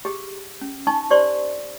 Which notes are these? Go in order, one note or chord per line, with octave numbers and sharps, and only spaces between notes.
G4 G#4
C#4
D#4 G#5 A5 C#6
G4 C5 D5 C6 C#6